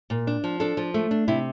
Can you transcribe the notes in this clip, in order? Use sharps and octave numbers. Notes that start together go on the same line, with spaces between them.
A#2
D4
F3
D4 A4
F3
A3
D4
C3 E4